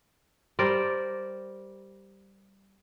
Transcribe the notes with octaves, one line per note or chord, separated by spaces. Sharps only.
G3 A#4 C5 D5